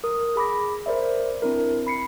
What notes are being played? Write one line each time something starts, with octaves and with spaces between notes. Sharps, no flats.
A#4 D#6
G#4 B5 D6 A#6
A#4 C5 D5 E5
C4 D4 E4 A#4
B5 C7 C#7